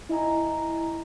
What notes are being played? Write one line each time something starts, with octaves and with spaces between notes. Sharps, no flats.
E4 D#5 G#5 A#5